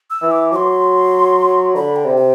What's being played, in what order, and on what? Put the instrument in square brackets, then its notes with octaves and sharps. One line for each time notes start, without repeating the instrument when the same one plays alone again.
[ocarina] E6
[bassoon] E3
[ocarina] D6
[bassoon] F#3 [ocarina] C6 D6
[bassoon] D3 [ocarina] B5
[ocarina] G5
[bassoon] C3
[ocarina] G5